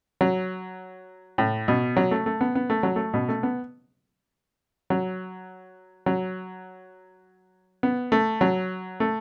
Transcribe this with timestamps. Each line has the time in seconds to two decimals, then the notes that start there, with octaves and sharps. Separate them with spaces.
0.21 F#3
1.38 A2
1.68 B2
1.97 F#3
2.11 A3
2.26 A3
2.41 B3
2.55 B3
2.70 A3
2.83 F#3
2.96 A3
3.14 B2
3.29 A3
3.43 B3
4.90 F#3
6.06 F#3
7.83 B3
8.12 A3
8.41 F#3
9.00 A3